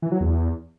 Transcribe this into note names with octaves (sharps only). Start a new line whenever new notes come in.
E3
F#3
E2